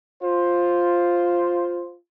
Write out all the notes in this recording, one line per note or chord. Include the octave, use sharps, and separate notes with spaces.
F4 C5